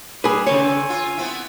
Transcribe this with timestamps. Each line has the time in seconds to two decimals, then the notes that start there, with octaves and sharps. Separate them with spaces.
0.24 G3 G#4 B4
0.47 C#3 C4 C#5 G#5
0.90 F4
1.18 B3 C4 E4